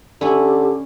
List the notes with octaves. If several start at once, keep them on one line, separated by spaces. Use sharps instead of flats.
D3 C#4 E4 G4